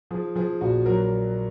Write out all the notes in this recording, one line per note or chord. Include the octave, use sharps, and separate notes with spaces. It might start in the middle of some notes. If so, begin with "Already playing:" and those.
F3 G#4
F3 G#4
A#1 F#4
F#3 A#4